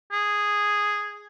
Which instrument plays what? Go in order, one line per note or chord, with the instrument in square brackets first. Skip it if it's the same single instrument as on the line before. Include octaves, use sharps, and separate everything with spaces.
[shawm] G#4